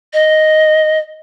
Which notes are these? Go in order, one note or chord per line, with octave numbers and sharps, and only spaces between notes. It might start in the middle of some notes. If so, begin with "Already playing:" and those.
D#5